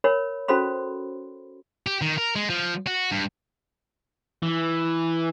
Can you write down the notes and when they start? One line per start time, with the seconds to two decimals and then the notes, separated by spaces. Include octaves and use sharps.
0.04 A#4 C#5 B5
0.48 C#4 F#4 A4 C5 B5 C6
1.87 G4
2.02 D#3
2.18 A#4
2.36 G#3
2.50 F3
2.87 F#4
3.12 G2
4.42 E3